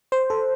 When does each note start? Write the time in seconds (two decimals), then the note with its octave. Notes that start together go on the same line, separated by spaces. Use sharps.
0.12 C5
0.30 A4